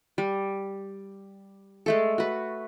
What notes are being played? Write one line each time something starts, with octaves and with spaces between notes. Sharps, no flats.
G3
G#3 A3 A4
F#4 B4